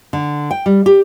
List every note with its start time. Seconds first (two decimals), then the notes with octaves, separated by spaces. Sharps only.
0.13 D3
0.51 G5
0.66 G3
0.86 G4